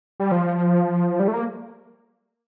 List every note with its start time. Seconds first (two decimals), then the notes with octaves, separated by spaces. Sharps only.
0.20 G3
0.32 F3
1.20 G3
1.28 A3
1.33 A#3